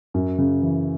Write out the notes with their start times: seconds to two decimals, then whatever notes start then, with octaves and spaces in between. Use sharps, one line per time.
0.14 F#2
0.38 C#3
0.62 E3